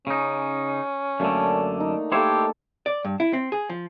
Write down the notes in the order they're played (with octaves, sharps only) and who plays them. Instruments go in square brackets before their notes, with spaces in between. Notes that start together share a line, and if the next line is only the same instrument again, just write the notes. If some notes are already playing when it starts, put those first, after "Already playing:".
[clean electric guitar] C#3 D#4 [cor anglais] C#4
[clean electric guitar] F#2 D3 [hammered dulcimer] A3 A#3 D5
[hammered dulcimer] D#4
[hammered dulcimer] A3 A#3 A4 [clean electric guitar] E4 C5 C#5 [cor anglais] G4
[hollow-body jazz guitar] D5
G2
E4
C4
G#4
F3